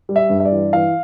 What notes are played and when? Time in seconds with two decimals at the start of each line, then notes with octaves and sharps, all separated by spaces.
0.09 G3
0.16 E5
0.30 G2
0.40 E5
0.45 D5
0.52 E3
0.73 E3 F5